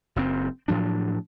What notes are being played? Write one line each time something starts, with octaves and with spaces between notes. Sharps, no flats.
F#1 F#2 C4
A2 F3 F#3 D4